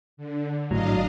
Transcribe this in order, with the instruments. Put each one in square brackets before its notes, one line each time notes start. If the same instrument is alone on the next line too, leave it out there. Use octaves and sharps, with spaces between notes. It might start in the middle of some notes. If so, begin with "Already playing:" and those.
[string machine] D3
[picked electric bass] G#1 A2 [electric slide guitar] F#3 [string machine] D4 D#5 F5